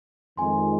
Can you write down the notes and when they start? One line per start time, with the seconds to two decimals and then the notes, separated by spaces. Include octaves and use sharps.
0.37 F2 D#3 G#3 G#5 C6